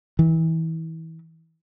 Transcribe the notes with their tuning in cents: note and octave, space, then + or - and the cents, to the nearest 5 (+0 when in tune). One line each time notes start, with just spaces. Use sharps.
E3 -30